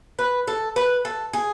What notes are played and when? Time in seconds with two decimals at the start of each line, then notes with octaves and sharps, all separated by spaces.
0.19 B4
0.47 A4
0.76 B4
1.05 A4
1.33 G#4